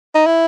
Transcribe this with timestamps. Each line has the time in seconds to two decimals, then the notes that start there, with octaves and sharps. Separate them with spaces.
0.15 D#4
0.26 E4